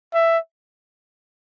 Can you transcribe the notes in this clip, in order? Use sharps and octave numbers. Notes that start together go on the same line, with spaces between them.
E5